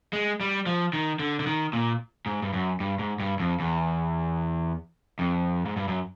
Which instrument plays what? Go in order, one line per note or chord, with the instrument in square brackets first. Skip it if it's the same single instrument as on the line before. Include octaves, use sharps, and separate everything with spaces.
[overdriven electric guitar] G#3
G3
F3
D#3
D3
D3
D#3
A#2
G#2
G2
F#2
G2
G#2
G2
F2
E2
F2
G#2
G2
F#2